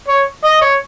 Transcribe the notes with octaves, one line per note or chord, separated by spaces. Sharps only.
C#5
D#5
C#5